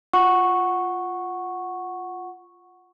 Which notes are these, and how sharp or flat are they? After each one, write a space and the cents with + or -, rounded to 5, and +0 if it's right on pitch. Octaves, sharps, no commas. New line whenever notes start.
F4 +0 F#5 +0 C#6 -5